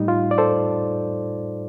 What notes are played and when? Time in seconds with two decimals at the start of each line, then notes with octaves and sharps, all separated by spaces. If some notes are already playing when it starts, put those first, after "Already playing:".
Already playing: A2 G3 D#4
0.08 F4
0.31 D5
0.38 A4 C5